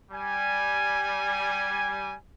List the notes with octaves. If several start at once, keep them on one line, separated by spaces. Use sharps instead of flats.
G3 G#5